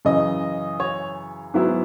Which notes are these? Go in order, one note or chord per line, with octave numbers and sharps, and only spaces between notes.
F#2 C#3 E3 D#5
C#5
G#2 F#3 B3 E4